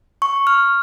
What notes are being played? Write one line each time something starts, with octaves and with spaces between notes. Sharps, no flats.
C#6
F6